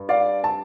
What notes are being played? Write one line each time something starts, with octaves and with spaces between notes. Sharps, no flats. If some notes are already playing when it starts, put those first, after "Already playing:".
Already playing: G2
D5 F5
A5